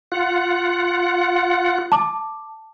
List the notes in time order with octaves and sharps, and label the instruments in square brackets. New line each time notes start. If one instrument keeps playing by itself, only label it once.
[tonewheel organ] F4 F#5
[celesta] A5 D6